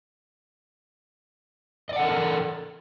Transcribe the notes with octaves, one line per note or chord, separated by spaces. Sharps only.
A4 A#4 D5 D#5 F#5